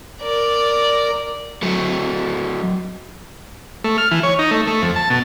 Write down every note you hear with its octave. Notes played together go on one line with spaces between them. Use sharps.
A#4 D5
F#3 A3
A3
F6
E3
C#5
D#4
A3
A3
F2
A5
B2